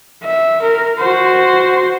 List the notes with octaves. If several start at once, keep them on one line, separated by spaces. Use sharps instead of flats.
E5
A#4
F#4 C5